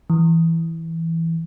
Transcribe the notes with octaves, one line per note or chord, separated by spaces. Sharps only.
E3